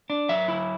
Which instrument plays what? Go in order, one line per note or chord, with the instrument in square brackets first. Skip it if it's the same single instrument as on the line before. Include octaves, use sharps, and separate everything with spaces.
[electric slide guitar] D4
F#3 E5
E4